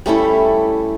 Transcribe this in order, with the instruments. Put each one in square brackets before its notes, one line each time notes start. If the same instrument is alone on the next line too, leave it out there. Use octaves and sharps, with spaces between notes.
[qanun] G3 A3 C#4 E4